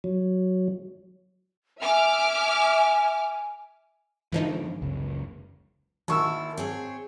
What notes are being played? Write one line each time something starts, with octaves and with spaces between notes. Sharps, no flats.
F#3
E5 G#5 D6 F6
G#2 D3 E3 F3 D#4
F#1 C#2
G#1 A#3 E4 C#6 E6
C4 G#4 C#5